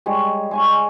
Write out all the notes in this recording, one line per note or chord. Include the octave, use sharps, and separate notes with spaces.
G3 G#3 C#5
G#3 G#5 C#6